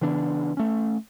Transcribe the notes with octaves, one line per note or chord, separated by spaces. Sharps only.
C#3 E3 B3 D4
A3 C#4